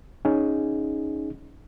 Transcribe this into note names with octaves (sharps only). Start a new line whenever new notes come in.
C#4 D#4 G#4